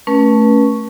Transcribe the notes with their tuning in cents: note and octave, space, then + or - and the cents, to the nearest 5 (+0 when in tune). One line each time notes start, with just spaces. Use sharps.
A3 +0 C#4 +0 B4 -40